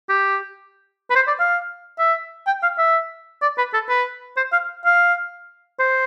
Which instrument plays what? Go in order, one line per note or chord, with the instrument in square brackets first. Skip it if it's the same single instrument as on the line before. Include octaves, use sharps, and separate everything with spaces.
[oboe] G4
B4
C5
D5
F5
E5
G5
F5
E5
D5
B4
A4
B4
C5
F5
F5
C5